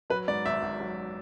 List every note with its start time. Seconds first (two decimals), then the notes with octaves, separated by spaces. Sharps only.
0.10 F#3 B4
0.28 G#2 D5
0.45 G#1 E5
0.63 G#1
0.80 F#3